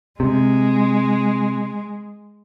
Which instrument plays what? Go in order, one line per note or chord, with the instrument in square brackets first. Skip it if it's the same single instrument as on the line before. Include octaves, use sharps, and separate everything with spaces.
[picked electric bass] C3 [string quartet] G#3